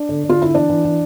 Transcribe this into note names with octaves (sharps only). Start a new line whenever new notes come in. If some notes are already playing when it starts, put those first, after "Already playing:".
Already playing: D4
D3
D3
F4
D3 E4
E3 D4
E3
E3